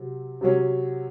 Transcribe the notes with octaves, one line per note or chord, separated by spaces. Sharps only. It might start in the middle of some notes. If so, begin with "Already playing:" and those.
Already playing: C3 F#3
C3 F#3 C#4